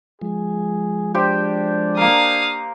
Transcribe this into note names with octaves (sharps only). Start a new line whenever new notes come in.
F3 G#3 G#4
D4 G4 C5 G5
A#3 A#4 F5 D#6